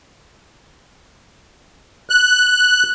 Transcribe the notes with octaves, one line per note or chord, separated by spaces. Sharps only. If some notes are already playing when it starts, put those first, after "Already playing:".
F#6